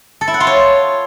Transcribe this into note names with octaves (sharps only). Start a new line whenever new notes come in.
A4
E4
F#5
F4
C#5